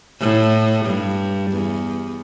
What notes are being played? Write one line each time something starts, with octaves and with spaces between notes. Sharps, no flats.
A2
G2
E2